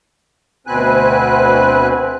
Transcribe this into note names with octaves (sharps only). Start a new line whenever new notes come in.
D2 B2 C4 B4 G#5 F#6